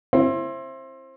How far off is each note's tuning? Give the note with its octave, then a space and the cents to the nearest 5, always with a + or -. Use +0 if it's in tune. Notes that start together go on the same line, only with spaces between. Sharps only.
C4 +25 E4 +25